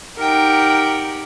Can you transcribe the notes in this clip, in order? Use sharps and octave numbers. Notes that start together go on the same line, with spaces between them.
D#4 G4 A#4 F#5 G5